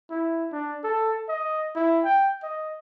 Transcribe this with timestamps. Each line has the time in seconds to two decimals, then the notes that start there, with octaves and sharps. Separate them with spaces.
0.10 E4
0.52 D4
0.84 A4
1.29 D#5
1.75 E4
2.04 G5
2.43 D#5